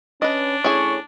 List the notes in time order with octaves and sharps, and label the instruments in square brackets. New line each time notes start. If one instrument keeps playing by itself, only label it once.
[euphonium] C#4 [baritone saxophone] D4 [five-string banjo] B4 D#5
[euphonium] A2 [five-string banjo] C#4 E4 G#4 [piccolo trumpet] C#6